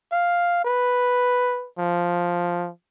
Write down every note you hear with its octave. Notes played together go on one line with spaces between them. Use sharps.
F5
B4
F3